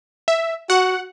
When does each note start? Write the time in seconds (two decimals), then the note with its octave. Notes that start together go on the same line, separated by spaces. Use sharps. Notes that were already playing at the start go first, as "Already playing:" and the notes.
0.28 E5
0.70 F#4 F#5